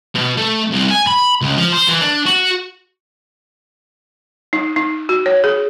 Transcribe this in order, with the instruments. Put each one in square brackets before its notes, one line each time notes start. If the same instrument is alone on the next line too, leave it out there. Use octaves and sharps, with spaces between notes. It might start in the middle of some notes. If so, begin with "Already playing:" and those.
[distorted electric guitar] B2
A3
C2
G#5
B5
C#2
F3
C5
E3
D4
F#4
[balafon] D#4
D#4
F#4
C#5
G#4